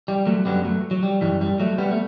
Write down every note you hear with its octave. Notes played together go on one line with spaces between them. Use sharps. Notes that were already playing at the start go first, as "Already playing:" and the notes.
G3
F#3 A3
F#2 D3 F#3 G3 B3
F#3 A3
F#3
G3
F#2 E3 G3
G3
F#3 A3
G3 B3
A3